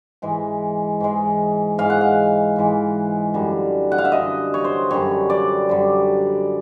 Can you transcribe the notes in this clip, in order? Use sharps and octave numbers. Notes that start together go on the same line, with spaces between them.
G#2 E3 G#3
G#2 E3 G#3
G#2 E3 G#3 F5
F#5
F5
G#2 E3 G#3
F#2 D3 G3
F#5
F5
E5
F#2 D3 G3 D#5
C#5
C5
F#2 D3 G3 C#5
D5
F#2 D3 G3